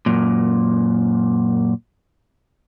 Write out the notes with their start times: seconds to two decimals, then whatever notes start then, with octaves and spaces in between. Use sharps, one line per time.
0.06 F#2 A#2